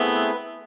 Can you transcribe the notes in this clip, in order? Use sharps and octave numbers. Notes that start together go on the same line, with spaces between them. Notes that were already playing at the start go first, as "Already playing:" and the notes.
Already playing: A3 B3 C4 E4 G#4 B4